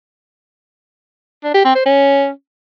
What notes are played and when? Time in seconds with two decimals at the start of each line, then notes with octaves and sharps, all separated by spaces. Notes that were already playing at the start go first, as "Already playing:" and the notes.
1.44 D4
1.54 G4
1.65 C4
1.75 C5
1.86 C#4